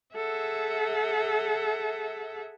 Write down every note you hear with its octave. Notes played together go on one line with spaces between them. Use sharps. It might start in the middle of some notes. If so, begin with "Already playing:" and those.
G#4 A4 E5 F#5